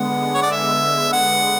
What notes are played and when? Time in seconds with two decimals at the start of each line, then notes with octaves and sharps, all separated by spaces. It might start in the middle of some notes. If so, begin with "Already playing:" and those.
Already playing: D3 G#3 B3 F#5
0.34 C#5
0.43 D5
0.51 E5
1.13 F#5